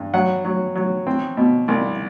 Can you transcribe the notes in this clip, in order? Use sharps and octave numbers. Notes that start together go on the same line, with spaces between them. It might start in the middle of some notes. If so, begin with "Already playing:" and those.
Already playing: G2
F#3 F#5
F#3
F#3
C4
B2
C2